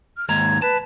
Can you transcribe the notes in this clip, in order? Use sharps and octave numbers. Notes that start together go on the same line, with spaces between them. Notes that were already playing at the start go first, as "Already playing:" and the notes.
F6
D#2 G#2 A#5 G#6
B4 A5